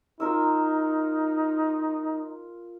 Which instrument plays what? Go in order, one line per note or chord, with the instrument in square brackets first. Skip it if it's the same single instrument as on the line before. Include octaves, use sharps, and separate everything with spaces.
[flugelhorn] D#4 [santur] F4 A#4 E6